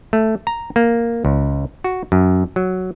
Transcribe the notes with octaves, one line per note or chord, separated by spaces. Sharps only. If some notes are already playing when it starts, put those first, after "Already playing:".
A3
A#5
A#3
C#2
F#4
F#2
F#3